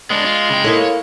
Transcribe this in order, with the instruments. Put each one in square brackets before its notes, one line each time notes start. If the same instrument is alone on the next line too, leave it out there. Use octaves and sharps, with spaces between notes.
[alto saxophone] G#3 [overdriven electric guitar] B3 D4
[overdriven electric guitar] F4
C#3 G5
[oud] A#3 E4 A4 [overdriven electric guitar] C#5